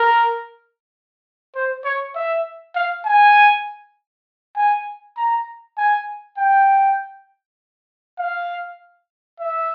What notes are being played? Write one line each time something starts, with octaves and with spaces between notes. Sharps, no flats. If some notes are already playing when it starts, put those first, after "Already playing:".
Already playing: A#4
C5
C#5
E5
F5
G#5
G#5
A#5
G#5
G5
F5
E5